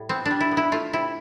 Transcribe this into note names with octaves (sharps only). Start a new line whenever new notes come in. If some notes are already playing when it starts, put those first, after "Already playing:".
Already playing: A2 G3
B3 C4
D4
G3
E4
B3
E4
A3 F4
C3 E4